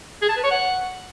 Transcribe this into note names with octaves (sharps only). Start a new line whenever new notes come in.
G#4
A5
B4
C#5
F#5